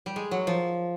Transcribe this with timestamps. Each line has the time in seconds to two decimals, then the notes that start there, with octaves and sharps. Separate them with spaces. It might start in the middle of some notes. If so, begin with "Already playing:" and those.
0.06 G3
0.16 G#3
0.31 F#3
0.47 F3